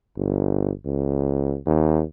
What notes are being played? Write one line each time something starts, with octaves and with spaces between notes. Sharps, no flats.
G1
C#2
D#2